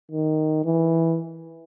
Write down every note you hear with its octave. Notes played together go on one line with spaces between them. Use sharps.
D#3
E3